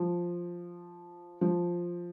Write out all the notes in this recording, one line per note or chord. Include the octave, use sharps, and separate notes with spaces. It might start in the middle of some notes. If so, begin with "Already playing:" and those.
Already playing: F3
F3